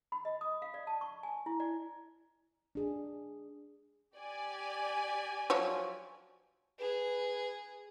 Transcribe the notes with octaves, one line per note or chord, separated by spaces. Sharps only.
B5
D#5
D#6
F5
D5
A5
C#6
G#5
E4
D5
D4 G#4
G4 D5 G#5
F3 F#3 C#5
G#4 B4